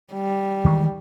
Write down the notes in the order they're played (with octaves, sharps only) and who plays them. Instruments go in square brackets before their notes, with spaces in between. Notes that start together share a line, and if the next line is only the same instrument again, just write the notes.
[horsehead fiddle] G3
[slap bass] D#3 E3 G#3